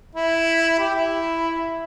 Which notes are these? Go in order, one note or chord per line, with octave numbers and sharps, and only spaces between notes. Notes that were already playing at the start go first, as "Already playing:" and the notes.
E4
G4
E4